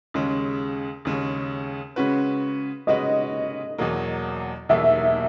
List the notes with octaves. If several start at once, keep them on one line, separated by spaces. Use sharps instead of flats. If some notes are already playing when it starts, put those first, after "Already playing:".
D#2 C#3 G#3 C#4
D#2 C#3 G#3 C#4
C#3 G#3 C#4 F#4 B4
C#3 G#3 C#4 F#4 B4 D#5
E2 B2 F#3 A#3
E2 B2 F#3 A#3 E5